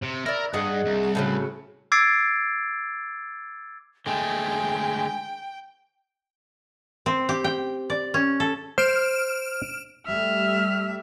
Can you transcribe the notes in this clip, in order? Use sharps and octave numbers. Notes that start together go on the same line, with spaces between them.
C3
E4 A#4 D5
G2 G#4 D#5 F#5
C2
A2 C#3 F#3
D6 E6 G#6 A6 C7 D7
D3 G#3 A3 G5 G#5
C4
G4
G5
D5
C#4
A4
C5 F6 D7 E7
G3 A3 E5 F6